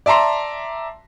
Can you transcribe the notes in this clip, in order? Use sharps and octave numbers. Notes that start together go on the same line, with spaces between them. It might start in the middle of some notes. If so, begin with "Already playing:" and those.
D5 E5 A5 A#5 C6